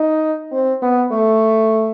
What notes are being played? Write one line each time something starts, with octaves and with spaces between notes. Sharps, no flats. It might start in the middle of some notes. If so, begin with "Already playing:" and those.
Already playing: D#4
C4
B3
A3